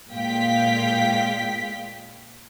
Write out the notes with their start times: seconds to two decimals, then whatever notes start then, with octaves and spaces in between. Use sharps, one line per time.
0.12 A#2 G#3 F5 G5 B6